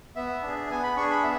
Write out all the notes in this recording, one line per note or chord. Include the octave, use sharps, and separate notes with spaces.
B3 E5
D4 G#4
B3 G#5
B5
D4 G#4 C#6
B5
B3 E5